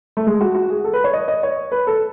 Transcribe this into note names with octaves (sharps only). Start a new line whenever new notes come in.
A3
G#3
F#4
F#4
G#4
A4
B4
C#5
D#5
D#5
C#5
B4
A4